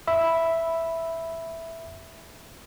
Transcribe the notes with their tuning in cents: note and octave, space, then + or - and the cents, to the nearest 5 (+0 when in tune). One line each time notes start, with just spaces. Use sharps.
E5 +0 B5 +0